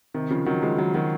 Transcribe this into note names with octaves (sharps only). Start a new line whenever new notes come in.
C3 D#3
C#3 F3
D#3 F#3
F3 G#3
D#3 F#3
D#3 F#3